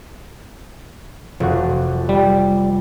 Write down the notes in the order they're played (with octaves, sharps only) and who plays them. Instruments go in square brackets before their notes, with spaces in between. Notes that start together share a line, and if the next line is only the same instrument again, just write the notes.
[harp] F1 [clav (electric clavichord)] F3 F#4
[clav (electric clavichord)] G3